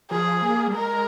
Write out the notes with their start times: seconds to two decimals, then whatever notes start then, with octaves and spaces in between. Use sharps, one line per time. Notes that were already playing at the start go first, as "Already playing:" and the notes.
0.11 F3 G#4
0.42 A#3
0.67 G3
0.74 G#3 A#4